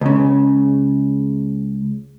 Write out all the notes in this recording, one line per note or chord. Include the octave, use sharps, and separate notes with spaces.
C#2 C#3